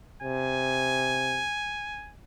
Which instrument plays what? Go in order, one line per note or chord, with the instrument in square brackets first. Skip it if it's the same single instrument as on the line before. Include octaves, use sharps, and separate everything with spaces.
[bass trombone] C3 [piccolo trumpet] G#5